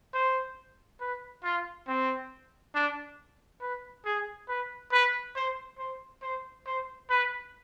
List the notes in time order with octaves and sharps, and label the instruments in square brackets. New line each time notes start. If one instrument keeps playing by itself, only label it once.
[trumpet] C5
B4
F4
C4
D4
B4
G#4
B4
B4
C5
C5
C5
C5
B4